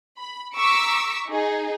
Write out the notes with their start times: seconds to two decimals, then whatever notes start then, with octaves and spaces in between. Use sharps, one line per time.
0.18 B5
0.56 A#5 C#6 D6 E6 B6
1.29 D#4 G#4